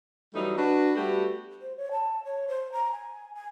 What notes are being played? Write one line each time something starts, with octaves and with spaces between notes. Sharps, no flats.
E3 F#3 G3 A3 D#4
D4 F#4 B4
G3 A3 B3 F#4 G4 A4
C5
C#5
A5
C#5
C5
A#5
G#5
G#5